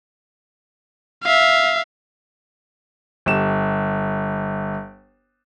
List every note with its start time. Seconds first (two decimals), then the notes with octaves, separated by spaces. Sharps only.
1.23 E5 F5
3.26 G1 G4 E7